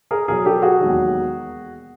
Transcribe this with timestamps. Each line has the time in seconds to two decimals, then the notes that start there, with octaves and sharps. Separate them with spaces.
0.11 G#4 A#4
0.28 E2 B2 F#3 G#4 A#4
0.45 G4 A4
0.62 F#4 G#4
0.81 E1 D#2 D#3 F#3